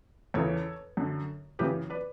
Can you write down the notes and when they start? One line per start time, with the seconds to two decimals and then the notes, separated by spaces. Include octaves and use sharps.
0.34 E2 C#3 E3 A4 C#5
0.97 F#2 D3
1.59 F#2 C#3 E3 G4 B4
1.90 B4 D5